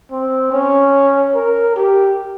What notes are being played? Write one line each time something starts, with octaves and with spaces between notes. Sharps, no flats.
C4
C#4
A#4
G4